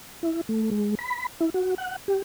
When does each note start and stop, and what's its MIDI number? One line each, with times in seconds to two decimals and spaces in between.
0.23 0.41 64
0.49 0.70 57
0.71 0.95 56
0.99 1.27 83
1.40 1.50 64
1.54 1.75 66
1.78 1.96 78
2.08 2.22 67